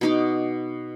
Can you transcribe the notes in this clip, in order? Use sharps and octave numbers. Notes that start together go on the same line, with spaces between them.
B2 D#4 D6